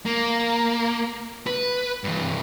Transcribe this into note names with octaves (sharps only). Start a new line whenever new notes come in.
A#3
B4
G2 E3